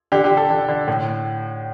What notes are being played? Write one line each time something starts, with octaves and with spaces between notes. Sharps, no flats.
D3 G4
G4
D3
A4
D3
D3
A2